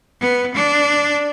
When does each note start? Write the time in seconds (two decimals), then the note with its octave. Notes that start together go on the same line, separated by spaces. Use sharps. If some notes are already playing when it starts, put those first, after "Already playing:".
0.20 B3
0.54 D4